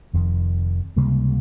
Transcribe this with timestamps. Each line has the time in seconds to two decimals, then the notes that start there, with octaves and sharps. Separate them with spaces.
0.13 F1 F2 D#3
0.96 C#2 C3 G3 A#3